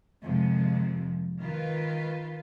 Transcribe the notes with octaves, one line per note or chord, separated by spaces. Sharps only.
F2 C3 D#3 F3 G#3
D#3 F4 B4